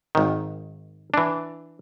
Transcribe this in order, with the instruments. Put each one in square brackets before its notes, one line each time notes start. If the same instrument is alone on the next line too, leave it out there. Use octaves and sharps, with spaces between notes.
[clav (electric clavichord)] G#1 D#3
E3 D4